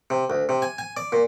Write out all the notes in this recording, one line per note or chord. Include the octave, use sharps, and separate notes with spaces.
C3
D2
C3
G#5
G#5
D5
A#2